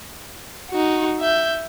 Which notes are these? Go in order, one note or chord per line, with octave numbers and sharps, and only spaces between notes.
D#4 F#4
E5 G6